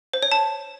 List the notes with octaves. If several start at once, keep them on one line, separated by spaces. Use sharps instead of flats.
C5
C#5
A5